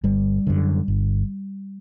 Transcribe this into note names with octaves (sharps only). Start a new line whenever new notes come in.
G1 G3
F#2 D3
G1